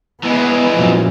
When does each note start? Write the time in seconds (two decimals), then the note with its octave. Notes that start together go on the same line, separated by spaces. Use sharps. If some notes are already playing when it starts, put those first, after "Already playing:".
0.24 E3 G#3 B3
0.72 F#2 A#2 F3